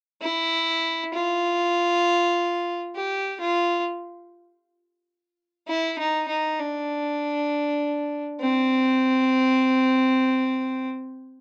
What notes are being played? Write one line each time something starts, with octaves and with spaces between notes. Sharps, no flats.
E4
F4
G4
F4
E4
D#4
D#4
D4
C4